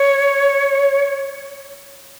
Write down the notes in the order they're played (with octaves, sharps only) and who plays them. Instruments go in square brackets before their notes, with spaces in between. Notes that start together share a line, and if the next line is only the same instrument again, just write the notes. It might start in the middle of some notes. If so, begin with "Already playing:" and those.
Already playing: [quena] C#5